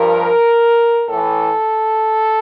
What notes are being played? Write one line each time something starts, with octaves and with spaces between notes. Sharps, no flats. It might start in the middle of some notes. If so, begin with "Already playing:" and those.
Already playing: G2 F3 A#4
A2 E3 A4